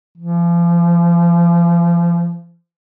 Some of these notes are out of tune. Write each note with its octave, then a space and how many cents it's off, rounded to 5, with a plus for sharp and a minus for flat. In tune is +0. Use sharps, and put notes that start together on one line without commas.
F3 -35